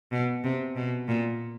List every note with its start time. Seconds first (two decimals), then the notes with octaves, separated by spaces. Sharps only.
0.12 B2
0.44 C3
0.76 B2
1.08 A#2